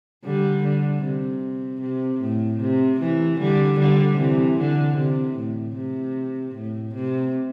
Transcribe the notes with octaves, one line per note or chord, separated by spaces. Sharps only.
D3 G3
D3
C3
C3
A2
C3
C3 E3
D3 G3
D3 G3
C3 E3
D3
C3
A2
C3
A2
C3